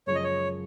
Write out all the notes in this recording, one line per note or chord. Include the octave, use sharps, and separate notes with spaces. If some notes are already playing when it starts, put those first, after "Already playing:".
F#2 C#3 F3 G#3 C#5
D#5
C#5